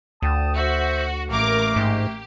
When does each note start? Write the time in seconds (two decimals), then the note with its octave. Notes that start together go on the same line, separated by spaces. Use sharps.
0.22 D2 G5 A5 D#6
0.56 F#4 C5 E5
1.29 A1 A3 A#3 A#4 D6
1.76 G#2 G4